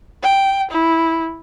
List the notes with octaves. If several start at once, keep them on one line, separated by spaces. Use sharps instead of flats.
G5
E4